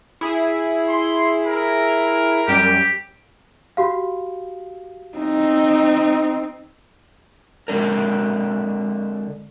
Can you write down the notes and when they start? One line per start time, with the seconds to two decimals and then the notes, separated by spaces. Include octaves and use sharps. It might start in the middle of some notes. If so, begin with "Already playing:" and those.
0.21 E4 G#4
0.89 C6
1.46 A#4
2.48 F#2 G3 G4
3.77 F#4 G4 F5
5.18 C4 D#4
7.68 D3 G#3 C4 D4 A#4